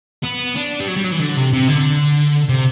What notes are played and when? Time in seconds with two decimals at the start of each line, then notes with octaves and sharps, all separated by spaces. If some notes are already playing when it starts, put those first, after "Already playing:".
0.23 B3
0.56 D4
0.80 G3
0.88 F#3
0.97 G3
1.05 F#3
1.12 E3
1.20 D3
1.37 C3
1.53 C3
1.68 D3
2.49 C3